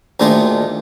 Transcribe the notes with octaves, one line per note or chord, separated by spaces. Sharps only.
D2 A#2 D#3 G#3 A3